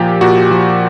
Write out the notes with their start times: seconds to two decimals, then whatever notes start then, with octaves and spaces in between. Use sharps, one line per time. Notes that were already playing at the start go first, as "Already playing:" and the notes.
Already playing: A#2 F3 G4
0.21 A#2 F#4
0.51 F3